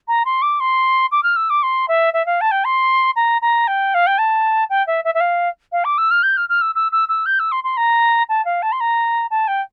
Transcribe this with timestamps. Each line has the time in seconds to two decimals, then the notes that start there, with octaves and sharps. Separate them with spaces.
0.08 A#5
0.25 C6
0.42 D6
0.60 C6
1.12 D6
1.23 F6
1.36 E6
1.50 D6
1.63 C6
1.88 E5
2.14 E5
2.26 F5
2.41 A5
2.51 G5
2.65 C6
3.16 A#5
3.42 A#5
3.68 G5
3.94 F5
4.07 G5
4.18 A5
4.70 G5
4.87 E5
5.05 E5
5.15 E5
5.20 F5
5.72 F5
5.85 D6
5.98 E6
6.11 F6
6.23 G6
6.37 F6
6.49 F6
6.61 E6
6.75 E6
6.92 E6
7.09 E6
7.26 G6
7.39 E6
7.52 C6
7.64 C6
7.77 A#5
8.29 A5
8.45 F5
8.62 A5
8.72 C6
8.80 A#5
9.31 A5
9.48 G5